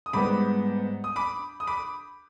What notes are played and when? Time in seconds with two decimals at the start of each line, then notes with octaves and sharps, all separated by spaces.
0.06 D#6
0.13 G#2 G3 B3 B5 D6
1.04 D#6
1.16 B5 D6
1.60 D#6
1.67 B5 D6